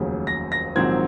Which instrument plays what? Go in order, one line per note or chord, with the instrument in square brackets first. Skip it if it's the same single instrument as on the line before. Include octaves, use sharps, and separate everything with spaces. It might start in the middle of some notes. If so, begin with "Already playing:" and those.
Already playing: [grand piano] F1 D#2 C#3 F#3
A#6
A#6
A#1 G#2 D#3 F#3 C4 G#6